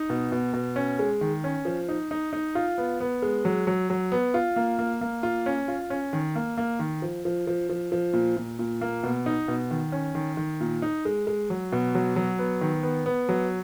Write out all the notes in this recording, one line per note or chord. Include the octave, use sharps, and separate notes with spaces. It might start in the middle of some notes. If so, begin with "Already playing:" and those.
Already playing: D#4
B2
B2
B2
C#4
G#3
D#3
C#4
F3
D#4
D#4
D#4
F4
B3
B3
G#3
F#3
F#3
F#3
B3
F4
A#3
A#3
A#3
F4
C#4
F4
C#4
D#3
A#3
A#3
D#3
F3
F3
F3
F3
F3
A#2
A#2
A#2
A#3
B2
D#4
B2
D#3
C#4
D#3
D#3
A#2
D#4
G#3
G#3
F#3
B2
F#3
F#3
B3
D#3
B3
B3
F#3